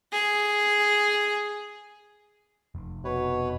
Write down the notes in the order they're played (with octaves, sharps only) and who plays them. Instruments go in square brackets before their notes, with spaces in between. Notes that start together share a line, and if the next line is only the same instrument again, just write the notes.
[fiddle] G#4
[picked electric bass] F1
[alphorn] B2 [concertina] B4 C#5